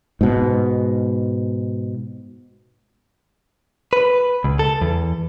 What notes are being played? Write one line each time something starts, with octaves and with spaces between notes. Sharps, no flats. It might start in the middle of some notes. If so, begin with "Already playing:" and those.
G#2 B2
B4
C#2
A4
E2